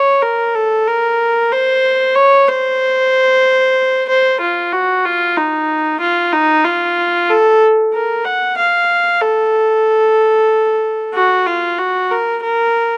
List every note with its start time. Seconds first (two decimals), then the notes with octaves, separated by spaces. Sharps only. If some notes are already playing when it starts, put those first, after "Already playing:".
Already playing: C#5
0.22 A#4
0.55 A4
0.88 A#4
1.52 C5
2.15 C#5
2.48 C5
4.09 C5
4.41 F4
4.72 F#4
5.05 F4
5.37 D#4
6.00 F4
6.32 D#4
6.64 F4
7.29 A4
7.94 A#4
8.25 F#5
8.57 F5
9.21 A4
11.14 F#4
11.46 F4
11.78 F#4
12.11 A#4
12.43 A#4